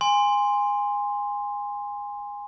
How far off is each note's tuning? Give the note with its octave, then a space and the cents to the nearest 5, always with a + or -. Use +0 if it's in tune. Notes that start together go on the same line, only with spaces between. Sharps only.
G#5 -20 C6 +0